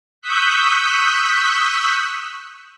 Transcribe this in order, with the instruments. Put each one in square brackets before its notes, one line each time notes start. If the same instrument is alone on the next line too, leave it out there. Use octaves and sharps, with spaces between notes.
[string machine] C#6 D#6 E6 F#6 G6 B6